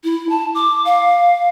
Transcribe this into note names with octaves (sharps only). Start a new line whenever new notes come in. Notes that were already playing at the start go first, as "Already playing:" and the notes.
E4
A5
D6
F5